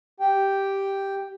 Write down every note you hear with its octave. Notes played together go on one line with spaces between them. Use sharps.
G4 G5